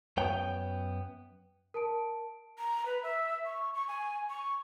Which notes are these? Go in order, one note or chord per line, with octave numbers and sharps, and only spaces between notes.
F#2 B3 C#5 G5
A#4 A5 D7
A#5
B4
E5
C#6
C#6
G#5
C#6